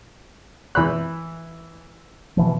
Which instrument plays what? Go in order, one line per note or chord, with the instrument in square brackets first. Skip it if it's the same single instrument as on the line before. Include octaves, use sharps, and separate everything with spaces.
[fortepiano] E3 B5 F#6
[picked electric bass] B2 E3 F3